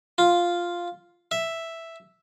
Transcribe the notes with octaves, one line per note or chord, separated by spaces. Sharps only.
F4
E5